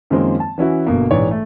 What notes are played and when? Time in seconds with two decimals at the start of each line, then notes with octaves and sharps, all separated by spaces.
0.10 F#2 D#3 F3 G#3 A#3 C4
0.40 A5
0.58 E3 C#4 E4 F#4
0.86 G1 B2 A#3
1.10 A#1 G#2 E3 C#5 D5
1.31 A3